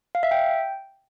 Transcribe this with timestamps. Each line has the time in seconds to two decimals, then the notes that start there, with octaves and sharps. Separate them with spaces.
0.15 F5
0.23 E5
0.31 G5